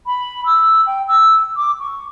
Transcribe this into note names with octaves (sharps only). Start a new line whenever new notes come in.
B5
E6
G5
E6
D6
C#6